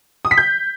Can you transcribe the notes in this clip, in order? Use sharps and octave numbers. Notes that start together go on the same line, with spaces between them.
D#6
B6
G6